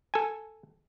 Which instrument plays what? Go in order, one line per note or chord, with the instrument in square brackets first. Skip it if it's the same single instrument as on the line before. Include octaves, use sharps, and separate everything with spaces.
[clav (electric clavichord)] A4 G#5